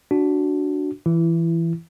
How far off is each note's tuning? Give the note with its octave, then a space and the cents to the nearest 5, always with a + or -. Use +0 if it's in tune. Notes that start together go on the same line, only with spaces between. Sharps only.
D4 -5 F#4 +0
E3 +5 E4 +25